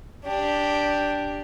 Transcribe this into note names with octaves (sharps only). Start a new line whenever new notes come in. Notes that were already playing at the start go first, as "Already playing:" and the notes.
D4 G4